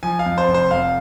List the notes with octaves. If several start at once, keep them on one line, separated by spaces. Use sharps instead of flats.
F3 G#5
F5
F2
C5
F1
C5
F2 F5